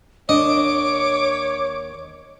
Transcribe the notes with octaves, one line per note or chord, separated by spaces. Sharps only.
D#2 D4 C#5 D#5 D6